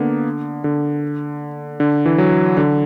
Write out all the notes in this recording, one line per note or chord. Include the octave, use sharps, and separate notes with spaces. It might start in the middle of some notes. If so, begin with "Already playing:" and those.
Already playing: D3 A#3 B3
D3
D3
E3
F#3
D3